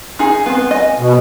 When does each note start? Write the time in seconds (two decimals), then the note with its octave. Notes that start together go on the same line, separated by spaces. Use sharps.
0.19 D#4 G#4
0.46 B3 C4
0.71 D#5 G#5
0.99 B2